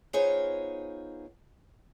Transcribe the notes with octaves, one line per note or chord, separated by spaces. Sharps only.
B3 D#4 F4 G#4 C5 C#5